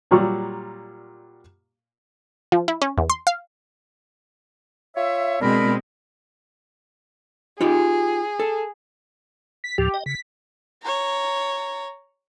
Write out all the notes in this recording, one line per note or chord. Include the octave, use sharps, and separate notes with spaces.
A#2 F#3 G3 C#6
F3
E4
C#4
E2
C6
F5
F4 C#5 E5
B2 G#3 C4 D4 A#4 B5
D#4 F4 G4 G#4
A4
B6
D2 A2 F3 G4
D#5
C#3 B6
C#5 A#5